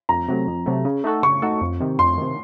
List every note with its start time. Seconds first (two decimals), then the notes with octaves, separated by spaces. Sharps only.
0.09 F2 A#5
0.28 C3 F#3 A3
0.47 F2
0.66 C3 F#3 A3
0.85 C#3
1.04 A3 D#4 F#4 A4
1.23 C#3 C#6
1.42 A3 D#4 F#4 A4
1.61 F2
1.80 C3 D#3
1.99 F2 C6
2.18 C3 D#3